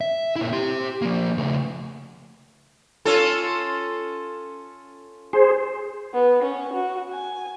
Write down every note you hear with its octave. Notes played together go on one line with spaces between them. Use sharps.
E5
A#2 E4
G4 C6
F3 A#3
C#3 A3
C#4 F4 A4
G#4 C5
B3
C#4
F#4
G#5